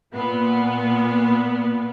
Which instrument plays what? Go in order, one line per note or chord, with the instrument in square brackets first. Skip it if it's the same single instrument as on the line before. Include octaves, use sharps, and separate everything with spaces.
[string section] A#2 B3